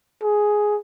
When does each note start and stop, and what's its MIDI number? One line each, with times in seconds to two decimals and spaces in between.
0.22 0.77 68